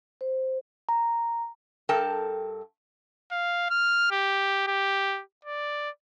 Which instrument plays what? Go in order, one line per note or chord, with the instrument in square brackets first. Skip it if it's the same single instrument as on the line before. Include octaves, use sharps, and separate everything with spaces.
[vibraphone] C5
[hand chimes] A#5
[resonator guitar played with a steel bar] G2 A4 A#4 G5 A5
[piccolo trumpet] F5
F6
G4
G4
D5